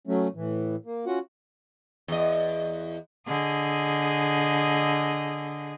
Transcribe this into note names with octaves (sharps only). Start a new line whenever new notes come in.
F#3 A3 C#4
A2 E3
A#3
C#4 F4 F#4 F#5
E2 D#5
D3 G#4 D#5